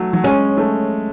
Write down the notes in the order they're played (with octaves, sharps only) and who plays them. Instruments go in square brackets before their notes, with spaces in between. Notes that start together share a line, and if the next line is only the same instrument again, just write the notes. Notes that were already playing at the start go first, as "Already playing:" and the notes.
Already playing: [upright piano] F#3 A3
F#3
[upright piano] G#3 [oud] C#4
[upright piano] A3